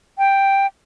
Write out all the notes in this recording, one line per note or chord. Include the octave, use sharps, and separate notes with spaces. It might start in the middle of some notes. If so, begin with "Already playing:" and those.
G5